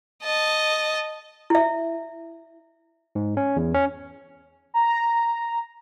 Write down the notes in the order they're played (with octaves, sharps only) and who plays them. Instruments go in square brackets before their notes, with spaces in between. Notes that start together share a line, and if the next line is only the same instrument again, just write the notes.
[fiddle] D#5 A5
[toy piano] E4 E5
[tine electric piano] G#2
C#4
E2
C#4
[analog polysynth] A#5